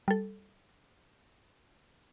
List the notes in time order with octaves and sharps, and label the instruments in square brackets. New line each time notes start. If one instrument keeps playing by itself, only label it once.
[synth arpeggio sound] G3 A4